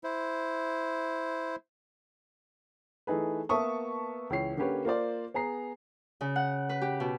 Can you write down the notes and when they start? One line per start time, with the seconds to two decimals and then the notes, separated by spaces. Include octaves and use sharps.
0.04 E4 C5
3.07 E3 A3 D#4 G#4 B4
3.49 A#3 B3 E5 A5 C#6 D#6
4.30 C#2 E3 C#5 C7
4.57 D3 A#3 C#4 G4 B4 C#5
4.85 A#3 F4 C5 D5
5.34 B3 G#4 A#5 C7
6.21 C#3
6.36 F#5
6.69 B4
6.81 G4
7.00 B2